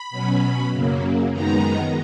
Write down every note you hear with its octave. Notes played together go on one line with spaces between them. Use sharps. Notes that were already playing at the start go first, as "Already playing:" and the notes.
Already playing: B5
B2 F#3 C#4
F#2 C#3 F#3 A#3
F#2 D#3 G#3 B3 D#4 A#5